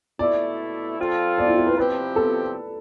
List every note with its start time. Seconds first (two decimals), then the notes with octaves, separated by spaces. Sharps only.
0.19 B2 A3 E4 D5
0.98 F3 C4 F4 A4
1.38 D5
1.47 E4
1.58 E4
1.67 B4
1.77 C3 F3 C4 G4 B4
2.16 A4